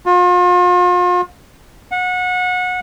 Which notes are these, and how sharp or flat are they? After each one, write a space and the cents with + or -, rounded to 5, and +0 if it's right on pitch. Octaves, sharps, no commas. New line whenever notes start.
F4 +40
F#5 -25